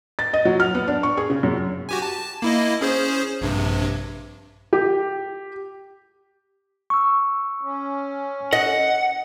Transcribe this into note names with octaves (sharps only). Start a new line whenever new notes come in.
A6
D#5
F#3
F6
B3
D4
C#6
G#4
C#3
F#2
F#4 G4 G#5
A5
A#3 E4 D#5
C#4 G#4 C5
A#1 G2 C3
G4
C#6 E6
C#4
D#5 F#5